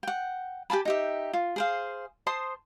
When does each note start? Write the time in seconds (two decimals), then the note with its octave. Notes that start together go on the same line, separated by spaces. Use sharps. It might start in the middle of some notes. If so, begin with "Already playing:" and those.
0.03 F#5 G5
0.70 G4 G#5 A5 B5
0.85 D#4 G4 E5
1.33 F4
1.56 G#4 C5 F5
2.27 C5 A5 C6 D#6